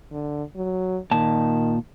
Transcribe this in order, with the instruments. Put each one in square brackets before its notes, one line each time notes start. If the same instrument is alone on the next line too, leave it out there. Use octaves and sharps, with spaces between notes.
[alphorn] D3
F#3
[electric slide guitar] A#2 A5 [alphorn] D#3